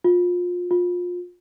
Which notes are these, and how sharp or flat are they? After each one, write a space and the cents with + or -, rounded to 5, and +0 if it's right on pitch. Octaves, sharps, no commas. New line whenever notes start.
F4 +25
F4 +25